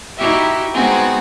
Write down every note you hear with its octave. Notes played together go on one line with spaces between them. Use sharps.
D#4 E4 F#4 G4 E5
G#3 B3 C4 D#4 F#4 G#4